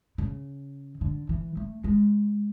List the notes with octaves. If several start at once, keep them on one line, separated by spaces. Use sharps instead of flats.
C#3
D3
E3
A3
G#3